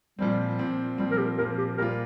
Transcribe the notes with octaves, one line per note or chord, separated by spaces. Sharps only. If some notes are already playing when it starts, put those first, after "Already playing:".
A#2 F3 G3 C4
A#2 F3 C4
A#2 F3 G3 C4
A#4
G4
A#2 F3 C4 A#4
G4
A#2 G3 A#3 F4 A#4